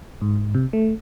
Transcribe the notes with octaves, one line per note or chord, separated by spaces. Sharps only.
G#2
C3
A3